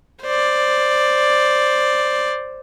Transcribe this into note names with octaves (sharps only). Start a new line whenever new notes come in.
C5 D5